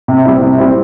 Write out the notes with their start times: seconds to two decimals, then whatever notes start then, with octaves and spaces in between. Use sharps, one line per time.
0.08 C3
0.25 G3 C4 E4
0.41 C3
0.58 G3 C4 E4